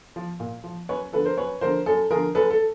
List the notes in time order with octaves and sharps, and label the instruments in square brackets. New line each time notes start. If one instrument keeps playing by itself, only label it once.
[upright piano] F3
A#2
F3
F#2 B4 C#5
D3 F3 A4 B4
A#4 C5
F#2 B4 C#5
D3 F3 A#4 C5
F#2 A4
D3 F3 G#4 A#4
F#2 A4 B4
A4